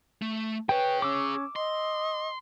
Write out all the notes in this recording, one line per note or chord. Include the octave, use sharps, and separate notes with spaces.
A3
G#4 B4 C#5 G5
C#4 D6 E6
D#5 C6